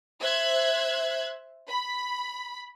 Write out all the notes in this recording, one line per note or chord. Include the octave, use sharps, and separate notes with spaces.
C5 E5 F#6 G#6
B5